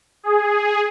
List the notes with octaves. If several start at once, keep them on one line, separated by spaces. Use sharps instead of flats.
G#4